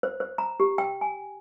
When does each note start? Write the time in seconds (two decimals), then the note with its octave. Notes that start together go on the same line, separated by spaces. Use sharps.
0.03 C5
0.20 C5
0.38 A#5
0.60 G4
0.78 G5
1.01 G#5